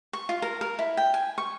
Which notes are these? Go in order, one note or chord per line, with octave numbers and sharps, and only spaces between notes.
C#6
F4
A#4
A#4
E4
G5
G#5
C#6